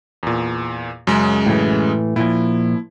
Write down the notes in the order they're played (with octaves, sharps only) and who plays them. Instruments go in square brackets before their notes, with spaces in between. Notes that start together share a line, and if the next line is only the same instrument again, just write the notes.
[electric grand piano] E2 A#2
F#2 C#3 G#3
[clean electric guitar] A2 E3
[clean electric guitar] A#2 F3 [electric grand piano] E4